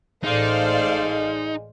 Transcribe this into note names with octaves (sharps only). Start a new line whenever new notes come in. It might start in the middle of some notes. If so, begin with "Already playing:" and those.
A1 G#3 D#4 A4 C5 D5 F5